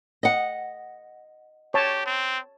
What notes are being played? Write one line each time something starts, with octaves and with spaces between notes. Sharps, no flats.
D#5 F#5
G4 C#5 A5
C4